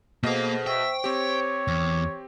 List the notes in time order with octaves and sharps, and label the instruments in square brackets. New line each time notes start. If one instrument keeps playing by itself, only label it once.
[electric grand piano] B2 D#5 [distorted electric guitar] A#3 F5 [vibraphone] G#4 A4 C5
[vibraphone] C5 C#6 [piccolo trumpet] E5 [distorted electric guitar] G5
[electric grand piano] C4 G4 [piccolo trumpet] C#5
[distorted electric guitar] E2 [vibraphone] D6